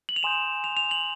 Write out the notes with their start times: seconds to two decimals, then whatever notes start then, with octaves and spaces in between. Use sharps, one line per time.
0.09 F#7
0.16 F7
0.23 G#5 C6 D#6 G6 E7
0.64 F7
0.77 F7
0.91 F#7